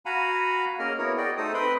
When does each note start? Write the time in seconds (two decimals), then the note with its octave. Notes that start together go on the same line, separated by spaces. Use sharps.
0.06 F#4 F5 F#5 G#5 A#5 B5
0.79 A#3 C#4 G#4 A#4 D#5 F6
0.98 B3 E4 F#4 A#4 C#5
1.17 F#4 G#4 D5 D#5 G5
1.37 A3 D#4 A4 C5 D#6
1.54 C4 B4 G5 B5 C6 D#6